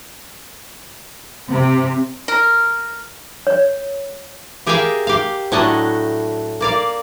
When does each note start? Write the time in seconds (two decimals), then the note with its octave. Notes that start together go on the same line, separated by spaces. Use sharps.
1.49 C3
2.28 A#4
3.47 C#5
4.67 G4 G#4 A#4 E5 F5 G5
5.07 G4 F5
5.52 A2 F#3 A3 D4 D#5 F#5
6.61 A#3 D5 F5